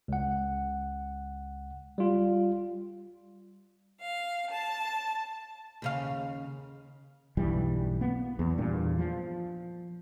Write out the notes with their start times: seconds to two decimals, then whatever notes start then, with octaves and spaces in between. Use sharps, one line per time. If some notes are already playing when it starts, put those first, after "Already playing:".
0.08 C#2 F#5
1.98 G3 F4
4.00 F5
4.50 A5
5.82 D#2 C#3 F5
7.37 B1 G2 E3 G3
8.01 A#3 B3
8.39 E2
8.58 E2 G2 A#2
8.98 F3